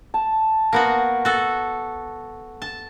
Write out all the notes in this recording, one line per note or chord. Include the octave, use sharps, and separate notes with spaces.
A5
A#3 B3 F#4
F#4 A4
A5